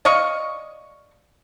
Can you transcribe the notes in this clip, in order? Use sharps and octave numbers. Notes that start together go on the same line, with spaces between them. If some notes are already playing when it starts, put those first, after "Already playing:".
D5 D#5 F5 C#6